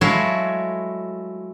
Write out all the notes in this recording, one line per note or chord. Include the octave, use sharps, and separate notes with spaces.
F#3 G#3 A3 E4 C#5 F5